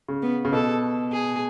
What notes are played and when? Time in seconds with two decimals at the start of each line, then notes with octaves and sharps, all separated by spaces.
0.08 C#3
0.22 B3
0.45 C#3
0.52 B2 A4
1.12 G#4